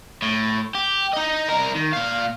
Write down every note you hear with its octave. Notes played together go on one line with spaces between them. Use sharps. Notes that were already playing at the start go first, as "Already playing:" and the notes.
A2
G4
D#4 D#5
C2 A#4
D#3
A#2 F5